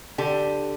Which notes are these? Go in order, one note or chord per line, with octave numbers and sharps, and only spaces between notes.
D3 G4